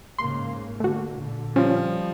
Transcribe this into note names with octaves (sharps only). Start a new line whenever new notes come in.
G#2 C#3 A#3 C6
D3 A3 A#3 F#4
A#2 D3
F3 G3 C#4 F4